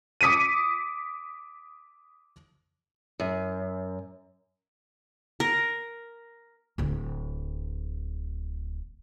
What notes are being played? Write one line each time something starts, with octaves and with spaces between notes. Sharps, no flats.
D6 D#6 B6 C#7 D#7
F#2
A#4
D1 D2